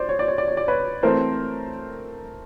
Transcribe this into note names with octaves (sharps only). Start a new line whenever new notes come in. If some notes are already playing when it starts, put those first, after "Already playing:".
Already playing: C5 D5
C#5
D5
C#5
D5
C#5
D5
B4 C#5
E3 A3 C4 A#4 C5